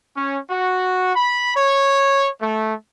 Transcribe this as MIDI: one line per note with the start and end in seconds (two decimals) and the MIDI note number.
0.16 0.38 61
0.50 1.13 66
1.16 1.55 83
1.55 2.28 73
2.41 2.74 57